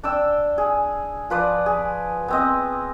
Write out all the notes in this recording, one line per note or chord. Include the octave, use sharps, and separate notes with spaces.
D4 G5 E6
G#4
F3 B4 D5 D#6
G#4
B3 C4 D#5